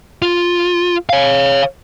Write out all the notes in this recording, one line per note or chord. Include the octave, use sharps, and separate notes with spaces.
F4
C#5 F5